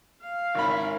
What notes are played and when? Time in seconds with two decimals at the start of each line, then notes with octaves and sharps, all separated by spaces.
0.22 F5
0.55 G#1 C#4 E4 A#4 B5